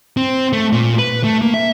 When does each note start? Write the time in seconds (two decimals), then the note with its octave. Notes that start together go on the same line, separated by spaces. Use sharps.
0.17 C4
0.53 A3
0.73 A#2
0.99 B4
1.24 A3
1.42 A#3
1.54 E5